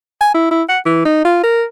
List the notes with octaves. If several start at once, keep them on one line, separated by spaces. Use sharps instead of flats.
G#5
E4
E4
F#5
E3
D#4
F4
A#4